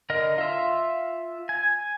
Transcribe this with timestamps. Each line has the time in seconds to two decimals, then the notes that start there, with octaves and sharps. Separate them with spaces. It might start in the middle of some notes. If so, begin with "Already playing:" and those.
0.10 D3 A#4 D#5
0.38 F4 E5
1.49 G#5